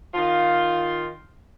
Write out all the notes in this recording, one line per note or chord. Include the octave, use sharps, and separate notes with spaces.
D#3 F4